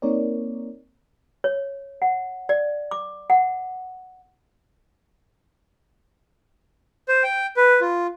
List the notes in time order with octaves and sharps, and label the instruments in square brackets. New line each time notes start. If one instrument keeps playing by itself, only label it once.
[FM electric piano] A#3 C4 D#4 A#4 C#5 D5
[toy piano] C#5
F#5
D5
D6
F#5
[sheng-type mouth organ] C5
G5
B4
F4